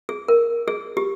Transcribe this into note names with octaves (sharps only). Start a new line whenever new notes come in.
G#4
A#4
G#4
G4